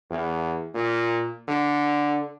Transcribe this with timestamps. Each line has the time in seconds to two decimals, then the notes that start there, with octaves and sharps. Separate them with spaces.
0.10 E2
0.74 A#2
1.48 D3